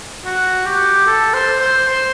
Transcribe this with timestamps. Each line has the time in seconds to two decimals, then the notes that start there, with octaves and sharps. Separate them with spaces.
0.25 F#4
0.66 G4
1.07 A4
1.34 C5
1.60 C5
1.88 C5